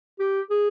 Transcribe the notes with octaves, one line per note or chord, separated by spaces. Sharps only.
G4
G#4